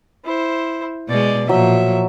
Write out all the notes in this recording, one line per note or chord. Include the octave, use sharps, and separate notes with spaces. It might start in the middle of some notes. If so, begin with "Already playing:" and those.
E4 C5
B2 G#3 D5
A#2 F3 F#3 E5